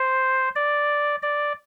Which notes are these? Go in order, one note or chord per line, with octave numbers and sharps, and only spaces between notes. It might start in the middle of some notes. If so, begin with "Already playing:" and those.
Already playing: C5
D5
D5